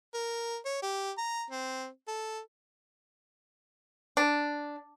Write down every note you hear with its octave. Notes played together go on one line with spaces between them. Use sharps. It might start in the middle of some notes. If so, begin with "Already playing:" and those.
A#4
C#5
G4
A#5
C4
A4
D4